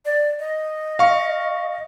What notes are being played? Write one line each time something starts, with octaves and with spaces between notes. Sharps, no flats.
D5
D#5
F5 C#6